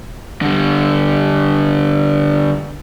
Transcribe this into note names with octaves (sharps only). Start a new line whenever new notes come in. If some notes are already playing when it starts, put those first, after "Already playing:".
D3 G3